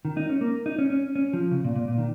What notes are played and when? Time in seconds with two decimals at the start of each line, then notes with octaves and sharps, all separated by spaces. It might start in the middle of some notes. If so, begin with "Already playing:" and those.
0.05 D#3
0.17 D#4
0.29 C#4
0.41 A#3
0.66 D#4
0.79 C#4
0.90 C#4
1.15 C#4
1.33 F3
1.51 C#3
1.64 A#2
1.76 A#2
1.88 A#2
1.98 D#3